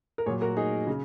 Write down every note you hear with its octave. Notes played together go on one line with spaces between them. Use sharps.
A#4
A#2 F#3 G#4 C#5
F#4 A#4
D#4 G#4
C#3